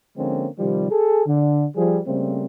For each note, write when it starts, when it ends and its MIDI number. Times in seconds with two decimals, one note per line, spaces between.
0.16 0.47 50
0.16 0.47 53
0.16 0.47 56
0.16 0.47 58
0.16 0.47 60
0.16 0.47 61
0.59 0.90 48
0.59 0.90 51
0.59 0.90 53
0.59 0.90 55
0.91 1.23 68
0.91 1.23 69
1.26 1.65 50
1.75 1.98 53
1.75 1.98 55
1.75 1.98 68
2.06 2.45 49
2.06 2.45 55
2.06 2.45 57
2.06 2.45 58
2.06 2.45 60